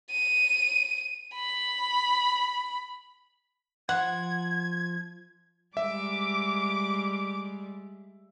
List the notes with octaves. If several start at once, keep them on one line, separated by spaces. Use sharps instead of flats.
D#7
B5
F3 F#5 G#6
G3 G#3 E5 D6